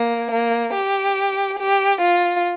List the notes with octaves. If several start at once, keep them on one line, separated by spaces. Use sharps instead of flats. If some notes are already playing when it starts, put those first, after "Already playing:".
Already playing: A#3
A#3
G4
G4
F4